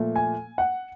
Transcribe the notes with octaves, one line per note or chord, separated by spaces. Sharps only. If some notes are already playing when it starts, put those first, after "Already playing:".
Already playing: A#2 F3 A3
G#5
F#5